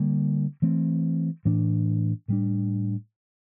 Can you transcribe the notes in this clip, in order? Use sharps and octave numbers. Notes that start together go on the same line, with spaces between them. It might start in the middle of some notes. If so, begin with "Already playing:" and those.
Already playing: D3 G3 A#3
E3 A3 C4
A2 E3 A3 D4
A2 G3 D4